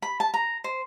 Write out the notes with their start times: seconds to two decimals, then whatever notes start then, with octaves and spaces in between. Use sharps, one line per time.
0.02 B5
0.20 A5
0.34 A#5
0.64 C5